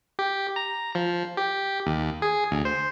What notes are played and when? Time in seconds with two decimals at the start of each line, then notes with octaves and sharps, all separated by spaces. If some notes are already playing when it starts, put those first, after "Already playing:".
0.19 G4
0.56 A#5
0.95 F3
1.37 G4
1.87 D#2
2.22 G#4
2.51 D2
2.65 C5